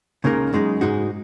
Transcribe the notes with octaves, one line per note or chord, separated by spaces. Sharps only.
C#2 C#3 A#3 D#4 A#4
F#2 C#3 G#3 D#4
G#2 G#3 D#4 F#4